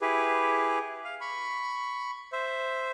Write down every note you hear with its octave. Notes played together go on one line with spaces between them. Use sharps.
E4 G4 G#4 B4
F5
B5 C#6
C5 E5